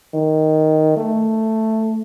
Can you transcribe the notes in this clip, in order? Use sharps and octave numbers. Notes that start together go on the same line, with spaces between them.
D#3
A3